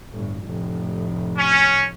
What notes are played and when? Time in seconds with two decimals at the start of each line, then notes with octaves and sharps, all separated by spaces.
0.12 G1 A2
0.43 F1 A2
1.38 C#4